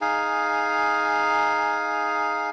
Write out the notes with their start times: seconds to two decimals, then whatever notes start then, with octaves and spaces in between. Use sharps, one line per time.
0.01 D#4 G#4 F5 G#5